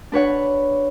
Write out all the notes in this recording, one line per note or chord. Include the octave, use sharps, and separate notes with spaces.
D4 B4 C#5 F#5